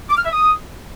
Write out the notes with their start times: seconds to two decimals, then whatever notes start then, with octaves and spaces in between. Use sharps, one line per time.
0.09 D6
0.17 F6
0.25 E5
0.33 D#6